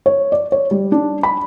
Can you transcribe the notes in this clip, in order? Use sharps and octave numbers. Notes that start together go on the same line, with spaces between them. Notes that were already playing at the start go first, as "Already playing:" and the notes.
C#5
D5
C#5
G3
D4
B5